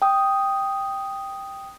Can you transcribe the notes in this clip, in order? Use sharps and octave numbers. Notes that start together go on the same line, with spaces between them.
G5 D#6